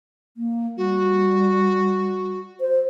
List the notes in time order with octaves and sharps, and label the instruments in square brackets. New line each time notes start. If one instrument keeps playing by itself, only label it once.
[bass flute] A#3
[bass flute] G3 [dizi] F#4
[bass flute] C5